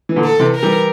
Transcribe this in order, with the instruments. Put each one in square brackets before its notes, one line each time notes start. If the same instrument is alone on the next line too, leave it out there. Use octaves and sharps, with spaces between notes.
[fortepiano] E3
A#2 D3
[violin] A4
[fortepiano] C3 E3
[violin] A#4
[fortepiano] E3 G3